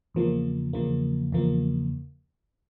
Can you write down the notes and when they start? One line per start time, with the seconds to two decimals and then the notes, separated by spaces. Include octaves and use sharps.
0.14 E2 C#3 F3 A#3
0.73 E2 C#3 F3 A#3
1.32 E2 C#3 F3 A#3